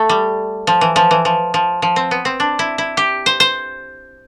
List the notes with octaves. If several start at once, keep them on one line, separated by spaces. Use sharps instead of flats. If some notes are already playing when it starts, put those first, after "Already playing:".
Already playing: A3
G3
F3
E3
F3
E3
F3
F3
F3
C4
B3
C4
D4
E4
E4
G4
C5
C5